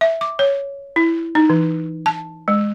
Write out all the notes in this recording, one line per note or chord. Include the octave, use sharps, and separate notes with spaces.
E5
D6
C#5
E4
D#4
E3
A5
G#3